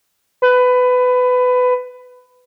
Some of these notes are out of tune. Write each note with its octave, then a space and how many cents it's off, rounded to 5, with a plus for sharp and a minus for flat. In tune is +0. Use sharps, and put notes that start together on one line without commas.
B4 +20